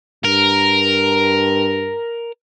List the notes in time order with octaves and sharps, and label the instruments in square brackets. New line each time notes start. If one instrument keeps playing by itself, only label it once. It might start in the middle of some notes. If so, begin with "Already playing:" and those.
[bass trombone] G2 [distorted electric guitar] A#4